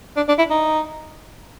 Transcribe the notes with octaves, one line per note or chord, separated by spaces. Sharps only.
D4
D4
E4
D#4